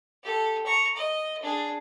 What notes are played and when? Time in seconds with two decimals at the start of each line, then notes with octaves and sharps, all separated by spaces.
0.24 G4 A4
0.66 A#5 C#6
0.96 D#5
1.42 D4 G#4